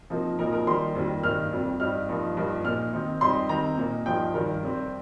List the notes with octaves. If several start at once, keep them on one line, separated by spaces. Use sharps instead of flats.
C3 F3 A#3 D#4
A#2 F3 A#3 D#4 A#4
A#4
D#3 G3 A#3 D#4 C6
F2 C3 D#3 G3 A#3
G2 D#3 A#3 D#4 F6
F2 C3 G3
G2 G3 D#4 F6
G2 F3 A#3 D#4
G2 F3 A#3 D#4
A#2 A#3 D#4 F6
D#3 C4 D#4
F2 C3 G3 D#4 C6
D#3 C4 D#4 A#5
A#2 A#3 D#4
G2 F3 D#4 G5
G2 D#3 G3 A#4
C3 G3 C4